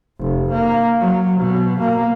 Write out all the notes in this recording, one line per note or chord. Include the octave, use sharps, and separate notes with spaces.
F1
A#3
F#3
B2
A#3